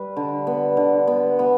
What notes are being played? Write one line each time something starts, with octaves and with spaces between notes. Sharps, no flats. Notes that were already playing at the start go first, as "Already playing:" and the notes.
Already playing: G3 B4
D3
B3
D3
B3
B3